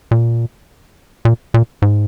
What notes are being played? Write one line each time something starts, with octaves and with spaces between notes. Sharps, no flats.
A#2
A#2
A#2
G#2